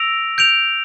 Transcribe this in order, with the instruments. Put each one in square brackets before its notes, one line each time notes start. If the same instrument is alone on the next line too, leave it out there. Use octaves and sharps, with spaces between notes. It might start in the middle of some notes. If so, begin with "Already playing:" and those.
Already playing: [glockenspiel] E6 A#6 D7 F7
G6 D7 F7